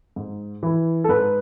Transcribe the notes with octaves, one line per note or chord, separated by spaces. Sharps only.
G#2
E3
A4
G#2 B4